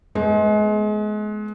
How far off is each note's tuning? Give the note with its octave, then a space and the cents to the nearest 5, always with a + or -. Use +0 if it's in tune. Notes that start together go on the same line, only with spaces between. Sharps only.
G#3 +30 B3 +0